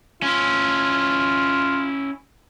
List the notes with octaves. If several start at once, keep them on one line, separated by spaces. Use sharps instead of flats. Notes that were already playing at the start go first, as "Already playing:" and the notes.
C#4 E4 F4